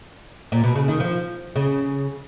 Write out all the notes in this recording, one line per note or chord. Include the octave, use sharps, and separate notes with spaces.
A#2
B2
C#3
D#3
F3
C#3